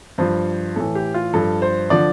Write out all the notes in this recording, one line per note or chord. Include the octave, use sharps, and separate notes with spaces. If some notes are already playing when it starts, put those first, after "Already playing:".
G2 F3 C5
A2 E3 A4
G4
F4
G2 F3 A4
C5
D3 F3 D5